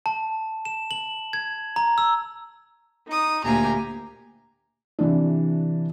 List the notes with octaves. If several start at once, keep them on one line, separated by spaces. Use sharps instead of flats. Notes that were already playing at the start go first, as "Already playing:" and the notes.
A5
E7
F#7
G#6
A#5
E6
D#4 D#6
D2 A#2 A#3 G4 G#5 A#5
C3 E3 D4